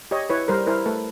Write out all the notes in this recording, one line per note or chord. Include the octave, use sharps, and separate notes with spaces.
G4 C#5 D#5
E4 B4 C#5
G3 A#4 C5
E4 A#4 C5
A3 A4 B4